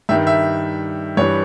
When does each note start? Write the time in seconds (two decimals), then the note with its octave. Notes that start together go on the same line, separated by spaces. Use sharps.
0.09 G2 D#3 G3 E5
0.27 E5
1.17 G2 E3 G3 C#5